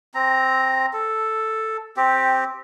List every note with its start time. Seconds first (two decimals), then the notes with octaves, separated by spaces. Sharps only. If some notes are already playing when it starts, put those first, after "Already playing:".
0.14 C4 A#5
0.93 A4
1.97 C4 G4